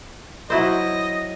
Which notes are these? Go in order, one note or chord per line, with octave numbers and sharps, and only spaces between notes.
F#3 E4 C5 D#5